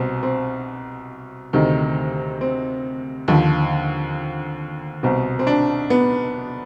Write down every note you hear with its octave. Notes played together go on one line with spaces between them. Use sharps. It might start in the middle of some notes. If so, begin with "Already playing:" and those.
Already playing: C2 B2 C4
C4
D2 C3 D#3
C4
D#2 D3 F3
C2 B2 C4
C4
D4
B3